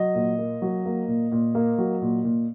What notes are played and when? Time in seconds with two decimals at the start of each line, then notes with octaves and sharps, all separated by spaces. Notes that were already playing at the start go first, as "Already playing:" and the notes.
Already playing: F#3 D#5
0.15 A#2
0.39 A#3
0.62 F#3
0.85 A#3
1.08 A#2
1.32 A#2
1.55 A#3
1.78 F#3
2.02 A#2
2.24 A#2